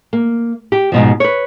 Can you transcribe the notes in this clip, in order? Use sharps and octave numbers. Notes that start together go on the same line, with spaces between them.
A#3
G4
G#2 B2 F3
B4 C#5